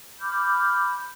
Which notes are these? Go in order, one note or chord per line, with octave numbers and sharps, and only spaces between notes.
B5 D6 F6 G6